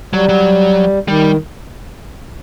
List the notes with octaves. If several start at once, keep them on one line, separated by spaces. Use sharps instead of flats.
F#3 G3
F#3
D#3 G3